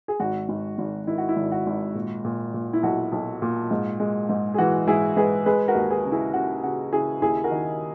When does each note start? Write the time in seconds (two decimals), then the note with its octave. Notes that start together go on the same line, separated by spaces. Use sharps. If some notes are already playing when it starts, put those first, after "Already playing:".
0.08 G#4
0.20 G#1 F#4
0.49 G#1
0.78 G#1
1.07 D#3 E4
1.18 F#4
1.29 E4
1.36 G#1
1.52 F#4
1.67 G#1
1.95 A#2
2.24 A#2
2.54 A#2
2.73 E4
2.83 B1 F#4
3.12 B1
3.42 A#2
3.71 G#2
4.00 G#3
4.29 G#2
4.54 G#4
4.58 E3 F#4
4.87 G#2 E4 G#4
5.17 G#2 G#4 B4
5.46 G#3 G#4 B4
5.68 F#4 A#4
5.75 D#2
5.90 G#4 B4
6.05 C#3
6.12 E4 G#4
6.33 C#3 F#4
6.63 C#3 F#4
6.92 C#3 E4 G#4
7.22 D#2 E4 G#4
7.44 F#4 A#4
7.51 D#3